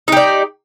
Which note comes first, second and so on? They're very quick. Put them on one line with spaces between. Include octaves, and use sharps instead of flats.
D#4 G4 D5